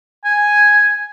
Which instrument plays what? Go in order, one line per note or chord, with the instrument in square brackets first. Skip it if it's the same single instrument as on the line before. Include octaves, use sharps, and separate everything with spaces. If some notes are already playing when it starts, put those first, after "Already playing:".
[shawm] G#5